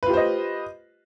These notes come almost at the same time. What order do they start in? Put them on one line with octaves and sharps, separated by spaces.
B4 F4 G4 C5 D#5